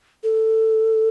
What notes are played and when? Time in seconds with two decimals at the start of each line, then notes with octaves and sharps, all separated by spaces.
0.23 A4